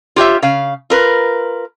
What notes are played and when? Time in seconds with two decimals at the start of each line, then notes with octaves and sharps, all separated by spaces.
0.16 F4 G4 C#5 E5
0.42 C#3 F5
0.90 F4 A#4 B4